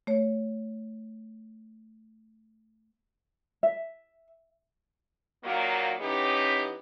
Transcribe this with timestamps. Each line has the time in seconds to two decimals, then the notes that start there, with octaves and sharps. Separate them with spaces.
0.07 A3 C#5
3.63 E5
5.43 A#2 D#3 F#3 A#3
5.99 E3 B3 C#4 D#4 G4